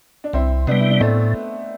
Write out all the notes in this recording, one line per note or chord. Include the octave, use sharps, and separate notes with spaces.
D4
C2 C4 E4
C3 G3 B3 D4
E4
D4
A2 A3 C4